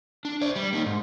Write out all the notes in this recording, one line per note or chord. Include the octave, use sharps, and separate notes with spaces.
D4
C5 D5
G3
A#3 D#4
G#2